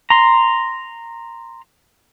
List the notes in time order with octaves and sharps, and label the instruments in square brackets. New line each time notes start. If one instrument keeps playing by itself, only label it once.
[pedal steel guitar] A#5 C6